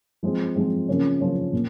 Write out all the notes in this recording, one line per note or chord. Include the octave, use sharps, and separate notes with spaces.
F3 G#3 C4
F3 G#3 C4
C#3 F3 A#3 C#4
C#3 F3 A#3 C#4
A#2